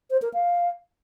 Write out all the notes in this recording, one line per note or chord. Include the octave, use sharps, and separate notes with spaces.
C5
A#4
F5